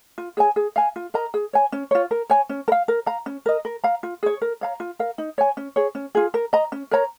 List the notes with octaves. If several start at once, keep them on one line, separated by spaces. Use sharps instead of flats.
F4
G#4 C#5 G#5
G#4
F5 G#5
F4
A#4 D#5 A#5
G#4
C#5 G#5
C#4
F4 C#5
A#4
C#5 G#5
C#4
A#4
F5
A#4
F5 A#5
C#4
A#4 D#5
A#4
F5 A#5
F4
G#4 C#5
A#4
C#5 F5 A#5
F4
A#4 F5
D#4
C#5 G#5
C#4
G#4 C#5
C#4
F4 G#4
A#4
D#5 A#5
C#4
A#4 C#5 A#5